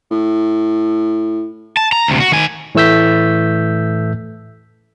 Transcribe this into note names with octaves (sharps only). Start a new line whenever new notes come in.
A2
A5
A#5
D2 C3
F#4
D#3 G#5
A2 E3 A3 E6 G6 B6